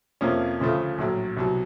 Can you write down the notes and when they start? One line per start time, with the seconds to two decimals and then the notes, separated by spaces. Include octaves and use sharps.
0.21 F2 C3 F3 A#3 C#4
0.60 D2 C#3 F3 A3
0.98 A#1 A2 F#3
1.37 C2 B2 F#3